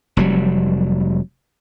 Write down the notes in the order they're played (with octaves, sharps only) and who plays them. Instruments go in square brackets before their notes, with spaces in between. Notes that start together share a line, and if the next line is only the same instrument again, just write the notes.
[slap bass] F1 F#3 G3